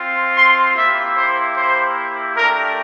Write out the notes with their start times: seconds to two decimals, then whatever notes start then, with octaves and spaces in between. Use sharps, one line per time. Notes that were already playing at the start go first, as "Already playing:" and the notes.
Already playing: C4 F4
0.34 C6
0.74 A#3 E4 G4 E5
1.13 C5
1.55 C5
2.35 A3 D4 G4 A#4